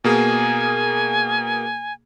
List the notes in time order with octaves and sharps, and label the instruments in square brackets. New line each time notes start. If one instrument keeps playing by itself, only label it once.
[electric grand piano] B2 A#3 G#4 [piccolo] G#5